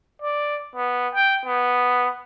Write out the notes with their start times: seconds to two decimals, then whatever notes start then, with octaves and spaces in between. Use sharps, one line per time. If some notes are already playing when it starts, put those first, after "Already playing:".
0.22 D5
0.75 B3
1.15 G5
1.45 B3